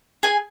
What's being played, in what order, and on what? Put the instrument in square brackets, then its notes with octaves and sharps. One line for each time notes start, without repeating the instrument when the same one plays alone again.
[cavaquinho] G#4 G#5